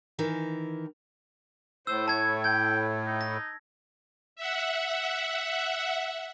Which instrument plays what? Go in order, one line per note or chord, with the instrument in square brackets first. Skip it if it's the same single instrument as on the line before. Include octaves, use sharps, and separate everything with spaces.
[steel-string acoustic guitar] D#3 E3 A#4
[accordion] A2 [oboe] C5 [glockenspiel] E6
[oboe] C#5 [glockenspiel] A5 G#6
[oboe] G5 [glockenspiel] G#6
[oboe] D#4
[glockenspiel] A#6
[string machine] E5 F#5